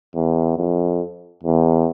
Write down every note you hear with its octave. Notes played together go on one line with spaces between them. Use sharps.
E2
F2
E2